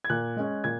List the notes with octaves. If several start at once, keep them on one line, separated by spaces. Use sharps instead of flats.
G#6
A#2 F#6
G#3 C#4
A#2 G#6